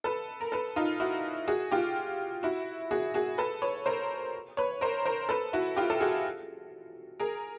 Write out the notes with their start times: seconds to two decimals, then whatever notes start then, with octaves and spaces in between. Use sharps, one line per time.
0.04 A4 B4
0.40 A#4
0.52 A4 B4
0.76 D#4 F4
1.00 E4 F#4
1.48 F#4 G#4
1.71 F4 G4
2.43 E4 F#4
2.91 F#4 G#4
3.14 F#4 G#4
3.38 A4 B4
3.62 B4 C#5
3.86 A#4 C5
4.57 B4 C#5
4.81 A#4 C5
5.05 A#4 C5
5.29 A4 B4
5.53 E4 F#4
5.76 F4 G4
5.90 A4
6.00 F#4 G#4
7.20 G#4 A#4